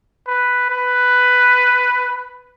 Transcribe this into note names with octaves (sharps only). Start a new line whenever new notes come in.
B4
B4